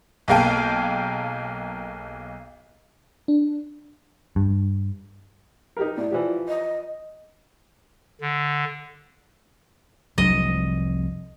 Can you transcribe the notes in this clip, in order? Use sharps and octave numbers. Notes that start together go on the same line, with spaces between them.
B1 A#3 G#4 F5 G5 A5
D4
G2
D#4 G4 A#4
A2 D5
E3 F3 G4
D#5
D3
F1 C2 F#3 D4 D#5